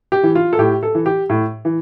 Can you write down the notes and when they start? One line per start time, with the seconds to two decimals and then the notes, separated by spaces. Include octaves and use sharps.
0.12 G4
0.23 E3
0.35 F4
0.53 A4
0.59 A2 G4
0.83 A4
0.95 E3
1.06 G4
1.29 A2
1.65 E3